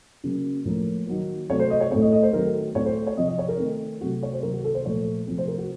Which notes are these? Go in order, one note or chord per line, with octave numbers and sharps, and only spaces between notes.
C#3 F#3 A#3
A2 F3 A#3
D#3 F#3 A#3
C3 F#3 A3 C4 C#5
C5
D#5
C#5
A2 A3 C4 C#5
D#5
D#5
C5
D#3 F#3 A3 C4 A#4
A2 A3 C4 C#5
C5
C#5
C3 F3 C4 D#5
D#5
C#5
A#4
D#3 A3 C4
C3 F#3 A3 F#4
C#5
C5
C3 D#3 F#3 A#3 A#4
F#4
A4
C5
A#2 F3 A3 C#5
C3 F3 A3 C4
C5
A#4
F#4